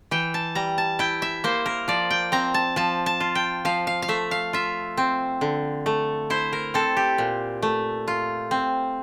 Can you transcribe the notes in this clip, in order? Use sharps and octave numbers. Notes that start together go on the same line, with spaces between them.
E3 G5
A5
G3 A#5
A5
E4 G5
E5
A#3 C5
A#4
F3 D5
G5
C4 A#5
A5
F3 A5
A5
F4
G5
F3 F5
F5
F5
A3 E5
F5
F4 E5
C4
D3
A3
E4 C5
A#4
C4 A4
G4
A#2
A3
F4
C4